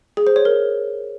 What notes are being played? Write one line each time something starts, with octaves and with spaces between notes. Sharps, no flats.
G#4
C5
C#5
A#4